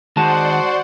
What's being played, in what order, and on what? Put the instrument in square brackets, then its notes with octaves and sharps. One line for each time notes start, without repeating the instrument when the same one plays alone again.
[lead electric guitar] D#3 G#3 [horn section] F#4 C5 [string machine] D5 F#5 C6 [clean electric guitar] A5